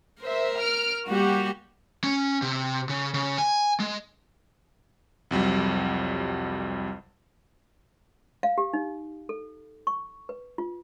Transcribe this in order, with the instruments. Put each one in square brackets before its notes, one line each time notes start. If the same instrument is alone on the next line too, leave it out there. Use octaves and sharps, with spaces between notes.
[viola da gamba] A#4 [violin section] C5 E5
[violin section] F6 D7
[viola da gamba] G3 A#3 G4 [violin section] F#4
[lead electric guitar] C#4
C3
C#3
C#3
G#5
G#3
[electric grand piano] C2 F2 F#3 G3
[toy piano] F5
G4
D#4
A4
C#6
B4
F4